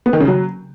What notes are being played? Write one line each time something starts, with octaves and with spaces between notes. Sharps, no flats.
B3
D#3
C#3
F#3